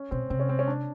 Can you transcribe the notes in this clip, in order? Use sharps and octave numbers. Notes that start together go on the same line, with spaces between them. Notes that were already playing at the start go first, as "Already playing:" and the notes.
Already playing: C#4
B2 C4
C3 C4
C#4
C4
C#4
D4